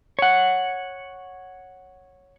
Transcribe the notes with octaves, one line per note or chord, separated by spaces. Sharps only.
C#5 F#5